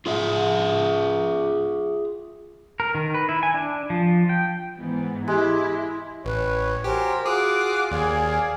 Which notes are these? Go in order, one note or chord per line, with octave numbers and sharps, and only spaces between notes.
F4 G#4 E5
A#4
D#3
B4
E4
G#5
D4
F3
G5
G#2 E3 B3
G#3 E4 G4
A1 B4 C#5
F#4 G4 A#4 C5 G#5
F4 F#4 G#4 D6
D#2 G#4 D5 F5 G#5